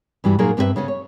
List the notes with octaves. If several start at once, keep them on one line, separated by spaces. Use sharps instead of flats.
G2 E3 G3 F#4
A#2 F#3 A#3 D#4 G#4 A#4
G2 B3 C4 F4 B4 E5
C#3 B3 C#4
C#5